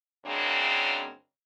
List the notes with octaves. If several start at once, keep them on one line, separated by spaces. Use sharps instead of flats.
F#2 C#3 G#3 A#3 C4 D4